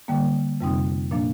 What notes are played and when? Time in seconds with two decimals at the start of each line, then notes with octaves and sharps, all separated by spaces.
0.08 D3 G3 A#3
0.60 F2 C3 G3 C4 D#4
1.11 A#2 F3 A#3 D4